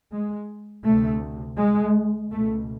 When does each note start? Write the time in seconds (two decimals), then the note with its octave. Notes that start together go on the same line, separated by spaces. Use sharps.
0.11 G#3
0.84 D2 C3 A3
1.57 G#3
2.31 C#2 B2 A3